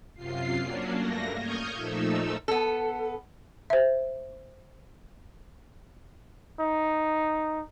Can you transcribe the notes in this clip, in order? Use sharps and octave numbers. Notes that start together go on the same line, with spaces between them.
F#2 C3 F4 C7
F#3 A#3 C#4 D4
G2 A3 A#3 A#6
C#6 D#6 F6 G6 G#6
A#2 F3 A3 D#4 E6
B3 A4
C5 E5
D#4